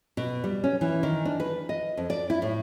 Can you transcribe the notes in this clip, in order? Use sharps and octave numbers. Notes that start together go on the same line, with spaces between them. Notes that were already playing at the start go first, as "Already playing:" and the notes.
B2
G3
C#4
E3
D#3
D4
B4
D#5
F2
D5
E4
A2